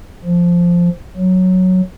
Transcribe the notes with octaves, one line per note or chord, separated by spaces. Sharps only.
F3
F#3